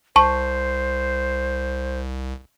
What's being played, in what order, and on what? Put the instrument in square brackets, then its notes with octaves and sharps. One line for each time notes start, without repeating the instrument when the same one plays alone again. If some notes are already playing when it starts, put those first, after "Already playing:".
[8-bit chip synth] C2 [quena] C5 [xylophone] A5 C#6